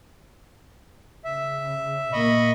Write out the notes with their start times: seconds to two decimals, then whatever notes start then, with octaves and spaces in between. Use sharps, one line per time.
1.25 C#3 E5
2.13 A#2 A#3 D#5 B5 C#6